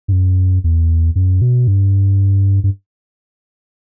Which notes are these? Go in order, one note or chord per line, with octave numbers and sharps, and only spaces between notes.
G2
F#2
E2
F#2
B2
G2
G2